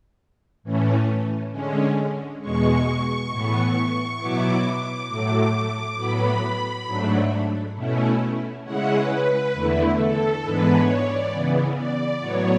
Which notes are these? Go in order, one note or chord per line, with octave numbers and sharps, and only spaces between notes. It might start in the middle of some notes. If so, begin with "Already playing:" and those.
A2 E3 A3 C#4
D3 G#3 C#4
E2 B2 G#3 C#6
A2 E3 B3
B2 F#3 B3 E4 D6
A2 F#3 A3
A2 F#3 B3 B5
G#2 F#3 A3 D4
B2 A3 C#4 E4
C#3 G#3 C#4 E4 F#5
B4
B4
E2 D3 A3 E4
A4
G#2 E3 G#3 B3 D4 B4
C#5
D5
C#3 E3 B3
D5
A2 F#3 B3 C#5